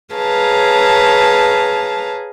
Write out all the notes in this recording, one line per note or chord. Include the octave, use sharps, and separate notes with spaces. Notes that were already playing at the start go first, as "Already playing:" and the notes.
G#4 B4 C#5 F5 A5 A#5